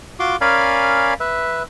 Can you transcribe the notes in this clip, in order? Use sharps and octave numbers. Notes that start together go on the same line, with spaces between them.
F4 F#4 C6 D6
C#4 A#4 D5 F5 G#5 B5
B4 E5